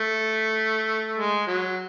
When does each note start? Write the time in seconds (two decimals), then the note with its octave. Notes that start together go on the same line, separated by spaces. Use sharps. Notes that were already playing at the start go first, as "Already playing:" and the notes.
Already playing: A3
1.18 G#3
1.47 F#3